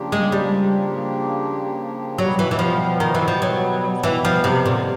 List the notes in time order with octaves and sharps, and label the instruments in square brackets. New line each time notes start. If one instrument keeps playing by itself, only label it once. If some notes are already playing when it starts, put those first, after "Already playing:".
Already playing: [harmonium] C#3 F3 A#3 D4 G4
[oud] G#3
G3
[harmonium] B2 G3 B3 [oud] F#3
[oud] E3
E3
F3
D#3
E3
F3
F#3
E3
F3
C3
[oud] A#2 [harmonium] D3 F3 A#3